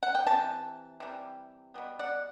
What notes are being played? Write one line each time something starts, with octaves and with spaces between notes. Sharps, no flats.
F#5
G5
C3 E3 A5
C3 E3 G3
B2 G3 B3
D5 F#5